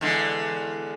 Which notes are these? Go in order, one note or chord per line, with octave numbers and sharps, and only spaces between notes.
E2 D3 G#3